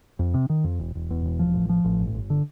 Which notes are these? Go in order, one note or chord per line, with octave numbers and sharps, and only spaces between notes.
F2
C3
D#3
F2
E1
E1
E2
E1
F3
A1
F3
A1
G1
G1
D3